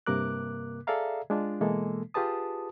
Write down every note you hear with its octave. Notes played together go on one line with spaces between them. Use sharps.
G2 C3 A#3 A#4 D6 F#6
G#4 A4 D5 E5 F5 A#5
G#3 D4 F4
B2 E3 G#3 A#3 A4
F4 G4 G#4 B4 A5 D#6